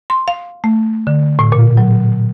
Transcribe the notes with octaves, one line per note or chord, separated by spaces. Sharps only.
C6
F5
A3
D3
A2
A#2
F#3